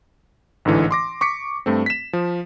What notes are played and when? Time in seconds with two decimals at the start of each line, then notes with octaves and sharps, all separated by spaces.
0.65 A1 G#2 D3 E3
0.91 C6 D6 A#6
1.21 C#6 D6 B6 C#7
1.66 G2 A3 C4
1.86 B6 E7
2.13 F3